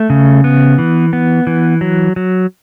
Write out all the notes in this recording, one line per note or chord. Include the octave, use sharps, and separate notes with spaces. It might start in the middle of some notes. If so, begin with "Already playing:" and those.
Already playing: A3
C#3
B3
E3
B3
E3
F#3
F#3